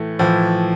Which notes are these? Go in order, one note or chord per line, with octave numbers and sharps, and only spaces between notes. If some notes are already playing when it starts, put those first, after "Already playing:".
Already playing: A2 E3 A3
A2 E3 F3